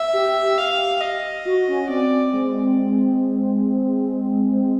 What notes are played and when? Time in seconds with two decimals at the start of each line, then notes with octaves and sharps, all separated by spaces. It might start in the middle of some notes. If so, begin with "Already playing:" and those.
Already playing: E5
0.13 G4
0.58 F5
1.01 D#5
1.46 F#4
1.68 C#4
1.89 C4 D5
2.33 G#3